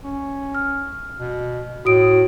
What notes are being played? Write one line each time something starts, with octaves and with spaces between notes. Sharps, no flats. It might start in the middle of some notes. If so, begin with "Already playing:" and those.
C#4
F6
B2
A2 F#4 D#6 D7